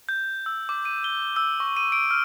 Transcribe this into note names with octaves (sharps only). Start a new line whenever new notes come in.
G6
E6
D6
D#7
G7
E6
C#6
D#7
D7
F6